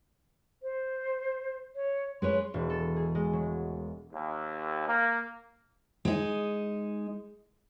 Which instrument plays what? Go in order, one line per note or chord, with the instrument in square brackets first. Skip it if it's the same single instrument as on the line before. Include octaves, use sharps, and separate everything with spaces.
[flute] C5
C#5
[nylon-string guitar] G#3 B4 C#5 [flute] C6
[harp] E1
A4
G#4
G#3
F#3
[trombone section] D#2
A#3
[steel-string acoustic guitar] G#3 D#4